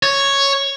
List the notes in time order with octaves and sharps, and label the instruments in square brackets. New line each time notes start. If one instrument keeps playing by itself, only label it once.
[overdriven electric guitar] C#5